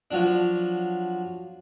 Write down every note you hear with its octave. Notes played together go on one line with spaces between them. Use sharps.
F3 F#3 D4